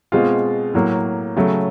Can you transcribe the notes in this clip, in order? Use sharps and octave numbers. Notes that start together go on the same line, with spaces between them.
B2 G#3 C4 F4
A2 F#3 A#3
C#3 F#3 A3 C#4